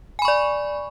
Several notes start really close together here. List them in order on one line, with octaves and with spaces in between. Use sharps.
G#5 B5 C#6 D5